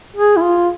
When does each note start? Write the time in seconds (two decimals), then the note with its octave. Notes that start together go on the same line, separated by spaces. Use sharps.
0.16 G#4
0.37 E4
0.42 F4